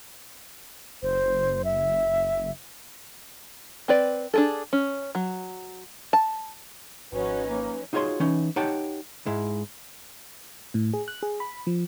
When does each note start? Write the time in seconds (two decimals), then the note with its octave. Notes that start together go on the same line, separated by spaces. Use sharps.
1.03 F#1 C5
1.65 E5
3.88 C4 B4 D5
4.34 D4 G#4 A4
4.73 C#4
5.15 F#3
6.13 A5
7.12 G#1 F3 C#4 D#4 F#4 B4
7.47 A#3
7.93 D#4 F4 F#4 G#4 C#5 C6
8.20 E3 C#4 D#4
8.56 D#4 G4 C#5 F#5 G5 A5
9.26 G#2 G#3 E4
10.74 A2
10.94 G#4
11.08 F#6
11.23 G#4
11.40 B5
11.67 F3